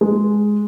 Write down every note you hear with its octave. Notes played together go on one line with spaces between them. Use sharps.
G#3